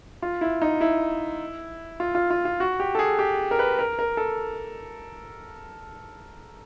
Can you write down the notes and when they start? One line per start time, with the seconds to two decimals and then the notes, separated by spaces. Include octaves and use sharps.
0.22 F4
0.41 E4
0.62 D#4
0.81 E4
2.00 F4
2.15 F4
2.30 F4
2.45 F4
2.60 F#4
2.80 G4
2.95 A4
2.99 G#4
3.19 G4
3.51 A#4
3.59 B4
3.79 A#4
3.99 A#4
4.17 A4